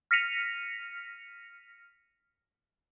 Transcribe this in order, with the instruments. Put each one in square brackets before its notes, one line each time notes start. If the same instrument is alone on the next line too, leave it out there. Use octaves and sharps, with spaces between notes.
[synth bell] F6 A#6 B6 C#7 D#7 F7